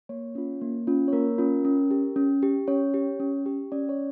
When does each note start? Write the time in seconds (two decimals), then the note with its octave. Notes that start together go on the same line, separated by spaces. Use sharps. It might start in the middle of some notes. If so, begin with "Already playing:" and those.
0.09 A#3 C#5
0.35 C#4 F4
0.61 A#3
0.87 C#4 F4
1.08 C#5
1.13 A#3 A#4
1.38 C#4 F4
1.65 C#4
1.91 G4
2.16 C#4
2.43 G4
2.68 C#4 C#5
2.94 G4
3.20 C#4
3.46 G4
3.72 C#4 D5
3.89 C#5